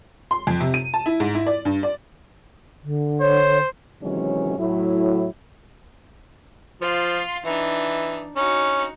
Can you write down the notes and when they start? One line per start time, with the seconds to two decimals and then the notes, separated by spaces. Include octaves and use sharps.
0.31 C6
0.47 F2
0.60 C3
0.74 D#7
0.94 A5
1.06 E4
1.20 G#2
1.35 E4
1.47 D5
1.65 G2
1.83 D5
2.83 D3
3.21 C5 C#5
4.02 C3 D#3 E3 F#3 G#3 C#4
4.58 A2 F#3 E4
6.81 F3 F4 C6
7.45 E3 D4 D#4
8.36 C#4 D#4 F#4